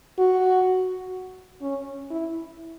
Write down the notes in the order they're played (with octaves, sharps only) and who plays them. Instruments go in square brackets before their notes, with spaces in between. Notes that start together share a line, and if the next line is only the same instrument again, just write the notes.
[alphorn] F#4
C#4
E4